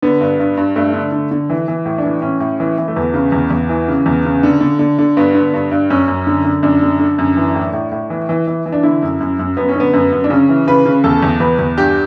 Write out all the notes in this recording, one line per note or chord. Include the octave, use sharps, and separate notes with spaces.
D3 B3
G2
G2
G2
G2 A3
D3
D3
D3
E3
E3
A2
D4
E3
A2 C#4
A2
E3
E3
A3
E2 B3
C#3
E2
E2
E3
C#3
E2
C#3
D3
D3
D3
D3
G2 B3
D3
G2
G2
F#2 C#4
F#2
D3
D3
F#2 D4
D3
D3
F#2
E3
A2
A2
A2
E3
E3
E3
E3
D4
D3 E4
F#2
F#2
F#2
F#2 B3
C#4
D3 B3
F#2 B3
F#2
D4
C#3 C#4
E3
C#3 B4
C#3
E2 A4
E2
E2 B4
E2
G2 G4